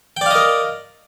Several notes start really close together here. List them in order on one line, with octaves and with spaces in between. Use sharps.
G5 D5 F5 D#5 A#4